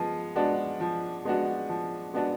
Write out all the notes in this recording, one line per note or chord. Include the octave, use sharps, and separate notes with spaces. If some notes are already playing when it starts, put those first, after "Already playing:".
Already playing: F3 G#3 B3
G#3 B3 D4 F#4
F3
G#3 B3 D4 F#4
F3
G#3 B3 D4 F#4